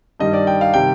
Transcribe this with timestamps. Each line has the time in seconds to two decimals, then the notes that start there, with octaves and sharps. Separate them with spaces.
0.20 G2 D#3 G3 D#5
0.33 D5
0.47 G5
0.61 F5
0.74 C3 D#3 G3 G5